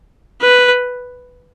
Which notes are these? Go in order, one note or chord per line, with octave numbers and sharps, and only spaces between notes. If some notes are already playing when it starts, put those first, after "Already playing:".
B4